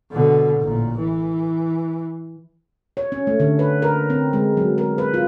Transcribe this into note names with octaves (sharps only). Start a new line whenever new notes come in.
B2 D3
A1 A#2
E3
C#5
C#4
A3
D3
B4
A#4
C4
G#3
F#3
A#4
B4
F4